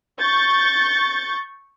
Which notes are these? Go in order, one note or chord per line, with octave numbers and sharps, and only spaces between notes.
C#6 G6 A6